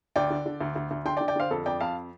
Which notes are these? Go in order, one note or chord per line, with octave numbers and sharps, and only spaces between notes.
D2 D5 G5
D3
D3
D2
D2
D2
D3 G5 C6
D5 G5
D3
D5 G5
D3 C5 F5
F2 A4
F2 D5 G5
F2 F5 A5